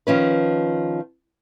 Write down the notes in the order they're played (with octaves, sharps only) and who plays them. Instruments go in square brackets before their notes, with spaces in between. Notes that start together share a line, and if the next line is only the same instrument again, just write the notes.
[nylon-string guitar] D#3 F3 C#4 B4